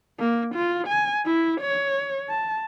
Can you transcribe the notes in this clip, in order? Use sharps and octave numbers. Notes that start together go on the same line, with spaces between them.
A#3
F4
G#5
E4
C#5
A5